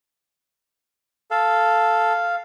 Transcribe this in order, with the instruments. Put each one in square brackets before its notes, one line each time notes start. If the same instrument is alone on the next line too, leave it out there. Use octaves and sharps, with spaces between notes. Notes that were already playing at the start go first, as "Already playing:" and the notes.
[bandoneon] A4 [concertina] F5